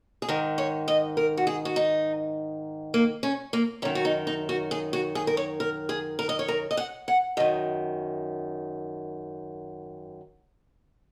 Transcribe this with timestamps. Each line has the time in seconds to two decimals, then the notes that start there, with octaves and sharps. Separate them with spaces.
0.22 G#4
0.29 G#2 D#3 A#4
0.58 C#5
0.88 D#5
1.17 A#4
1.37 F#4
1.47 G#4
1.65 F#4
1.76 D#4
2.94 A#3
3.23 C#4
3.53 A#3
3.82 F#2 D#3 C#4
3.95 F#4
4.05 D#4
4.27 D#4
4.49 F#4
4.71 G#4
4.93 F#4
5.15 G#4
5.27 A#4
5.37 C#5
5.60 A#4
5.89 G#4
6.19 A#4
6.29 D#5
6.39 C#5
6.48 A#4
6.71 D#5
6.77 F#5
7.08 F#5
7.37 F#2 D#3 D#5